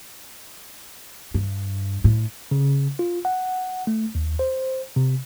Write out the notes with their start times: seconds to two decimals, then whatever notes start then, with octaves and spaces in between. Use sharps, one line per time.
1.34 G2
2.04 A2
2.51 C#3
2.99 F4
3.25 F#5
3.87 A3
4.15 D#2
4.39 C5
4.96 C3